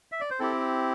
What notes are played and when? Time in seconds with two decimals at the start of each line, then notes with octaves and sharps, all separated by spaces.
0.12 E5
0.21 D5
0.30 C5
0.40 C4 E4 G4 A4